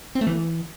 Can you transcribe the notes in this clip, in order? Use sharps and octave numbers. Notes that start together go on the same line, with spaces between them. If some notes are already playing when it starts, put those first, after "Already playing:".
C4
A3
E3